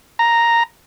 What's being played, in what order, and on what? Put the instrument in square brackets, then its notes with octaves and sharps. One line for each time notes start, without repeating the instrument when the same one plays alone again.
[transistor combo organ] A#5